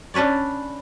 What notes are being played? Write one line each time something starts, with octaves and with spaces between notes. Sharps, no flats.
C#4 D4 B4 C#5 D5